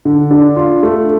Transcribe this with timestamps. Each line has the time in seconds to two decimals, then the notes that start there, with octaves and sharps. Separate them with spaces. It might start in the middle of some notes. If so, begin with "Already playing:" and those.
0.05 D3
0.31 D4
0.56 F4
0.83 A3